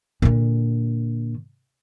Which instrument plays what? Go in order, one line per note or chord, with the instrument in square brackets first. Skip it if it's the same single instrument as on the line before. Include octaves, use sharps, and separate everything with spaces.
[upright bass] A#2 D3